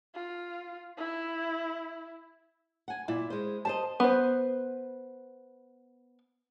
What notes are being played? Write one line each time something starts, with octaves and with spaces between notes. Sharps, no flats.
F4
E4
F#5 G#5
A#2 E4
G#3 C5
G4 C5 D#5 A5
B3 B4 C5